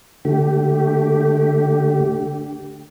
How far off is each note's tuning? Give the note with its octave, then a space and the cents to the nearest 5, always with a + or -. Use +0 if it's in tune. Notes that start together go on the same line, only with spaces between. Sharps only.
D3 +0 A3 +0 G4 -15